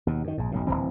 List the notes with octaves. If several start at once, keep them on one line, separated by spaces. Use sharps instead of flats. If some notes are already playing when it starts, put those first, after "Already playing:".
D#2 B2
F#2 D#3
A#1 G#2
F#1 B1 A2
D1 D#2 E3 C4